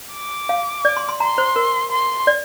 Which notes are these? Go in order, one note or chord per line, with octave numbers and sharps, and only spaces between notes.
D6
F5
D5
C6
C6
A#5 C6
C5
A#4
C6
D5